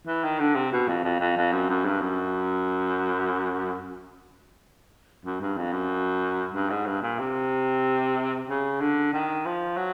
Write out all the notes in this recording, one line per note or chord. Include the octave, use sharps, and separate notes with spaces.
E3
D#3
D3
C3
B2
F2
F2
F2
F2
F#2
F#2
G2
F#2
F#2
G2
F2
F#2
G2
G#2
G2
A#2
C3
C#3
D3
D#3
F3
F#3